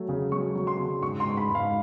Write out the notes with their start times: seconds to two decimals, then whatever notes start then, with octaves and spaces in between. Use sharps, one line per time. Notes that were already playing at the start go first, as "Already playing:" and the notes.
Already playing: F#3 A3
0.09 C#3
0.32 F#3 C#6
0.55 F#3
0.67 C6
0.79 C#3
1.02 G#2 C#6
1.20 C6
1.25 G#2
1.37 B5
1.49 G#2
1.55 F5